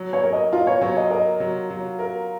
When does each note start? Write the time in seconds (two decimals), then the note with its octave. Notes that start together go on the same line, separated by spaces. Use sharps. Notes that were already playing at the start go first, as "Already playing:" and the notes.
Already playing: F#3
0.13 C#5
0.23 A#4
0.33 D#5
0.52 F4 D#5
0.67 C#5
0.81 F#3 C#5
0.97 D#5
1.10 A#4 D#5
1.40 F#3
1.70 F#3
1.99 A#4